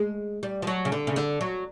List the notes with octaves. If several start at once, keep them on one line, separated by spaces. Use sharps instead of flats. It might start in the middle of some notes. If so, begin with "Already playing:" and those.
Already playing: G#3
G3
F3
F#3
C#3
D3
C#3
D3
F#3